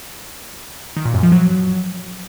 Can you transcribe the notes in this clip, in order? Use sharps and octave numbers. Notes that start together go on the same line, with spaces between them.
D#3
A#2
F#2
F3
F#3